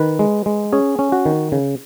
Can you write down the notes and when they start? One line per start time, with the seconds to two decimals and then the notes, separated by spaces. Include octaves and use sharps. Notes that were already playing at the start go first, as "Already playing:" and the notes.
Already playing: D#3 B4
0.19 G#3
0.46 G#3
0.73 C#4 G#4
0.99 C#4
1.12 F#4
1.26 D#3
1.52 C#3